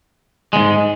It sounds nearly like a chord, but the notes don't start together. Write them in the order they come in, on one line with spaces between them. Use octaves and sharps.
G#3 E2 G#2